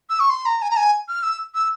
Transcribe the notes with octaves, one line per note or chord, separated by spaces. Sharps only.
E6
C#6
C6
A#5
G#5
A#5
G#5
F6
E6
E6